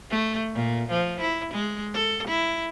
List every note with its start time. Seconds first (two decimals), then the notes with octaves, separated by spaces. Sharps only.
0.10 A3
0.54 A#2
0.90 F3
1.20 E4
1.54 G#3
1.94 A4
2.27 E4